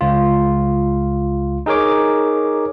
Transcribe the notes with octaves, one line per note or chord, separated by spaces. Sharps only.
C#2 F4
D#4 G#4 A#4 C#5 D6